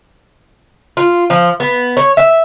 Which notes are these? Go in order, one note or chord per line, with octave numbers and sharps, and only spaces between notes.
F4
F3
B3
C#5
E5